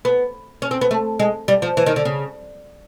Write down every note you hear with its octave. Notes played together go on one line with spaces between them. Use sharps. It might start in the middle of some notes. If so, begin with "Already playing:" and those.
B3
C#4
C4
B3
A3
G#3
G3
F3
E3
D#3
D3
C#3